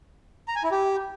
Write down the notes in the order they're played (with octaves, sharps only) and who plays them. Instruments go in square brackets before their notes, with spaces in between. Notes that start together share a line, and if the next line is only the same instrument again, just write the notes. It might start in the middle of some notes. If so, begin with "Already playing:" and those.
[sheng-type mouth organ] A#5
G#5
E4
G4